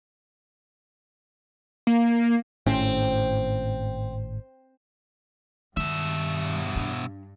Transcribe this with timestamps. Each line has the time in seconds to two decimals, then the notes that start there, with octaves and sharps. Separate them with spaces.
1.87 A#3
2.66 G#1 A2 C4 C#4
5.77 G2 B2 D#3 E5
6.76 D4